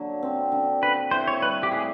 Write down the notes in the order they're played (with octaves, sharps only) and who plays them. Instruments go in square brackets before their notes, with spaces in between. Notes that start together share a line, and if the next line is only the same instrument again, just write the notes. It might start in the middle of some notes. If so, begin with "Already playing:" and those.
Already playing: [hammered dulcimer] D3 F#3 A#3
C4
D3
[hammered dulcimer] D3 [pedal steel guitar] B4
[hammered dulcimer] E4 [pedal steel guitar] C5
[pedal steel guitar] C#5
[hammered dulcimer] G3 [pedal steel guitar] B4
[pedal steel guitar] G4
[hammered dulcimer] A2 [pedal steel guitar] G#4